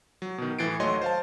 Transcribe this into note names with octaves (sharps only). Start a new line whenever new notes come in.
F#3
B2 D#3
A2 E3 A6 C7 D7
D#2 F#3 A3 C#5 D#5 C6
C5 F5 A5